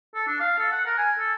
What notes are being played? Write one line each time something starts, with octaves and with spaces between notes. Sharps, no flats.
A4
D4
F5
A4
F#5
A#4
G#5
A4